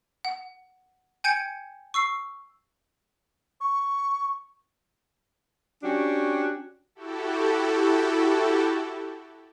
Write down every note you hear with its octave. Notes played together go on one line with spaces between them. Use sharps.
F#5
G5 G#5 G6 G#6 C#7 D7
C#6 E6 C7
C#6
C#4 D4 F#4 G4
E4 F#4 G4 A4